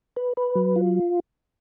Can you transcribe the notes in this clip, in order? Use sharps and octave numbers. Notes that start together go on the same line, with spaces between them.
B4
B4
F#3
F4